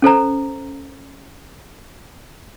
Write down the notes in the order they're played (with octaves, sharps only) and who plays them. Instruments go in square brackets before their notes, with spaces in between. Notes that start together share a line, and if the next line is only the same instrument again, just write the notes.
[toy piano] C#4 A4 C5 A#5